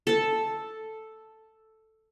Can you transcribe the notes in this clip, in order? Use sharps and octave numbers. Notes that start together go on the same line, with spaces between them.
A4 A5